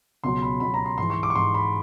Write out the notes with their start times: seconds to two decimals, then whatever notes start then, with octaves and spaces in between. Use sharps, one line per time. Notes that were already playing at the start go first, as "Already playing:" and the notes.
0.23 C#2 B2 F#3 C6
0.42 B5
0.60 C#2 B2 F#3 B5
0.74 A#5
0.86 C6
0.98 G#2 E3 C6
1.10 C#6
1.23 D6
1.30 C#6
1.35 G#2 E3 C6
1.54 B5